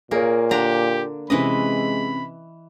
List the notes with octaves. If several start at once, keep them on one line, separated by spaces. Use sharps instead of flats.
A#2 A#3 G#4 A#4 C#5
D3 D4 G4 A#5
C3 E3 G#3 C4 C#4 B4 D#5 B5